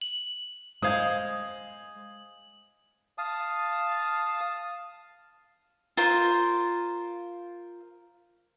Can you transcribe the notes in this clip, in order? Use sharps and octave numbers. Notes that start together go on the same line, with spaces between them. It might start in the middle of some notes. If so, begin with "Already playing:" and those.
F#7
G#3 C5 F5 D#6 G#6
F5 A5 D#6
F4 A#4 C5